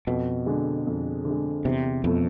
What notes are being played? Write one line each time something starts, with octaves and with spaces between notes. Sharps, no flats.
F2 B2
D3 G#3
F2
D3
G#3
E2 C3
F2 B2 A3